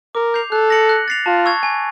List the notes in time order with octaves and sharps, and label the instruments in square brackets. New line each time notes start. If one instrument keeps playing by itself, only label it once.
[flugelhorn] A#4 [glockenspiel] D6
[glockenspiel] G6 C7 F7
[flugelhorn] A4 [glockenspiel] F#6
[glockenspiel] A#6 C#7 F#7
F#6
A6 C7 F7
[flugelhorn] F4 [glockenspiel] A5
[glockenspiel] C#6 E6 G#6
G#5